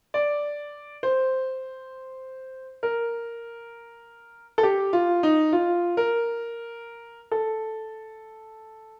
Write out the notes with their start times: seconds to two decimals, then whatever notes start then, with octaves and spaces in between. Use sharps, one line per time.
0.14 D5
1.03 C5
2.83 A#4
4.58 A4
4.63 G4
4.93 F4
5.23 D#4
5.53 F4
5.97 A#4
7.31 A4